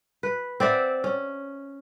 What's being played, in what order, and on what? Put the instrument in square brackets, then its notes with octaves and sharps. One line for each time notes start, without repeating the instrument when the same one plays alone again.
[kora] B4
C4 D5 E5 F#5
C#4